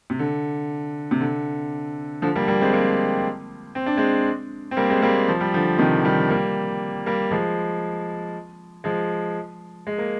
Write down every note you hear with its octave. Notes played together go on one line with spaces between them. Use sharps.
C3
D3
C3
D3
D3 F3
G3 A#3
G3 A#3
G#3 C4
G3 A#3
C4
D4
G#3 C4
C4
G3 A#3
G#3 C4
G3 A#3
F3
G3
D3 F3
C3 D#3
D#3 G3
G3 A#3
G3 A#3
F3 G#3
F3 G#3
G#3
A#3